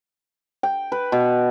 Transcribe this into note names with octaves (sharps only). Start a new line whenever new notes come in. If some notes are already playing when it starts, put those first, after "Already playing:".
G5
B4
B2